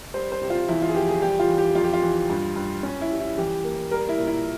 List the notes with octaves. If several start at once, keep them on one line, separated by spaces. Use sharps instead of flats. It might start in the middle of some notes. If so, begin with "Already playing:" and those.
G3 C5
C5
C3
F4
E2 E4
F4
G#4
F3 G4
G#4
G3 G4
F4
E3
G4
F2 F4
G4
F4
E3
G2
G2
C#4
E4
G3
E4
E3 G4
A#3
G3 A#4
E4
A#2
E4